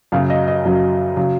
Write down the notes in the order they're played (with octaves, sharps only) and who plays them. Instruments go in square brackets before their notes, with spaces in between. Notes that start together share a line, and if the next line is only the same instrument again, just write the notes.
[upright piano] F#2 C#3 F#3 F5
D#5
D#5
F#2 C#3 F#3
C#3 F#3